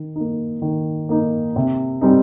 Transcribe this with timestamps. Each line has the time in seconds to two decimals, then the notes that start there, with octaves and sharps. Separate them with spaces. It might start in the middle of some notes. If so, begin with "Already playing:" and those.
Already playing: D#3
0.16 A#3 D#4
0.62 D#3
1.09 A#3 D#4
1.56 C3
2.01 G3 C4 D#4